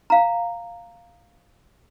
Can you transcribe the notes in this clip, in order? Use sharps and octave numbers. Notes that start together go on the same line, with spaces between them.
F5 A#5